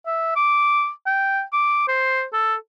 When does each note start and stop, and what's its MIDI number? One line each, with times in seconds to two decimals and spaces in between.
0.06 0.33 76
0.36 0.90 86
1.06 1.42 79
1.53 1.85 86
1.88 2.24 72
2.33 2.55 69